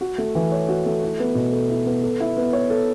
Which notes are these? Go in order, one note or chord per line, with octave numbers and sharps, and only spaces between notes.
F#4
A3
E3
C#5
F#4
A3
E4
B3
B2
A4
E4
B3
A4
E4
B3
C#5
A4